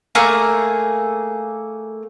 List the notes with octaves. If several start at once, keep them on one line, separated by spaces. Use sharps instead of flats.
A3 A#3 G#4 A#5